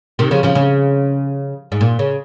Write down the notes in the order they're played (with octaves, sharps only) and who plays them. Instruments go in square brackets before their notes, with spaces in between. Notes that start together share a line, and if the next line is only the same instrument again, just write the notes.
[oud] C3 D#3
C#3 F3
C#3 F3
C#3
G#2
A#2
C#3